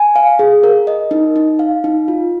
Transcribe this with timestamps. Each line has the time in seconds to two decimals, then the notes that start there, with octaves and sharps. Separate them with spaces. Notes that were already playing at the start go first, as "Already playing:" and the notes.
Already playing: G#5
0.16 F5
0.39 G#4
0.63 A#4
0.87 D#5
1.11 D#4
1.36 D#4
1.59 F5
1.84 D#4
2.08 F4